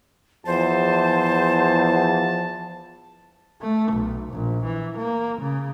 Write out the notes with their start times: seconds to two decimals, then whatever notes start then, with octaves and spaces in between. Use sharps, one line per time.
0.46 E2 F3 C5 A5
3.61 A3
3.92 B1
4.32 A#1
4.65 E3
4.97 A#3
5.39 C#3